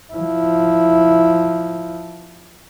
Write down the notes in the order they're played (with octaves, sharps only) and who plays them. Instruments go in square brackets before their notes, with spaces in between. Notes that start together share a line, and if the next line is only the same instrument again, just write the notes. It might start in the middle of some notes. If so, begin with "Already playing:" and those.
[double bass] F3 E4